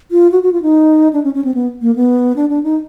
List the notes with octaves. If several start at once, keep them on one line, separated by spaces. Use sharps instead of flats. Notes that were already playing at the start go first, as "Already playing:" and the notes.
F4
F#4
F#4
F4
D#4
D4
C#4
C#4
C4
B3
A#3
B3
D4
D4
D#4